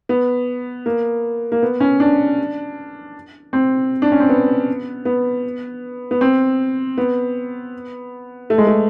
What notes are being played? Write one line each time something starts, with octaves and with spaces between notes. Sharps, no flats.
B3
A#3
A#3
B3
C#4
D4
C4
D4
C#4
C4
B3
B3
B3
C4
B3
A3
G#3
A3